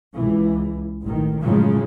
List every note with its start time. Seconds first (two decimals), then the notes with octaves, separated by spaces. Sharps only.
0.13 C#2 E3
1.02 A1 D#3
1.43 F#2 A2 C#3 F3 F#3 G#3